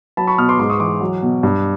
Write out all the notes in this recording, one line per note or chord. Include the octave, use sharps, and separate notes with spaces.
F#3 A5 B5
B5 C#6
B2 D#6 F6
C6 D6
G#2 C6 D6
C#6 D#6
E3 C6 D6
F#3
B2
G2